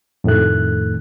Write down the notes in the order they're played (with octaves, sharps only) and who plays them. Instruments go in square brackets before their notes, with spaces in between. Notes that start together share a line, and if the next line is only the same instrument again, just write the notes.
[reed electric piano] F2 A2 D#3 A3 F#6